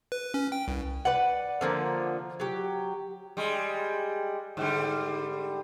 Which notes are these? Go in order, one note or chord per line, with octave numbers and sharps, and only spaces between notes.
B4
C#4
G5
C2
B4 D5 F#5
D3 F3 A#3
F#3 G4
G3 G#3
G#2 D3 G3